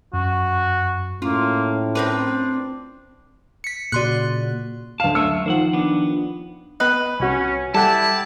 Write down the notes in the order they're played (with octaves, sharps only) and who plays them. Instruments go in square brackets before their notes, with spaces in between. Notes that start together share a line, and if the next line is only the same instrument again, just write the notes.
[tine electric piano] F#2 [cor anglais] F#4
[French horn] A2 [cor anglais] A#3 [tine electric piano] C#4 [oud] F4
[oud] C4 A#4 B4 [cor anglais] D4
[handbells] B6 C#7
[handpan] A#2 C#3 F#4 [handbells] D5 C6 F#6
[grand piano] D2 F5 [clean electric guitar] A5
[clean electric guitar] F#2 A3 E5 [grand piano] E6 C#7
[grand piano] D#3 F3 [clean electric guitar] C5 D5 F#5
[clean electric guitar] B3 D4
[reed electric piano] B3 D#5 [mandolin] B4
[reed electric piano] C2 F#4 [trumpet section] C#4
[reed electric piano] G3 A4 F#5 [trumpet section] E4 D5 G5 [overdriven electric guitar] A5